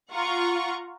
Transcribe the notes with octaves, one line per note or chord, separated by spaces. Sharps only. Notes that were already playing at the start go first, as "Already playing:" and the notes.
F4 F#5 A#5 C#6